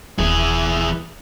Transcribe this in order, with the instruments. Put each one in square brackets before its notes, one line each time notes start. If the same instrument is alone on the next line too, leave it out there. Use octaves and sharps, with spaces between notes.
[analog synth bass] D#1 [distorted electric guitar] E3 G#4